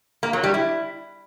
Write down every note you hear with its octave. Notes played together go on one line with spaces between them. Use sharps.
A#3
F#3
G3
E4